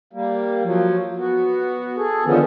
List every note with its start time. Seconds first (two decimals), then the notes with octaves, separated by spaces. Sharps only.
0.13 G3 A#3
0.63 F3 F#3
1.18 B3 F#4
1.97 G#4 A4
2.25 D3 D#3 F3 B3 C#4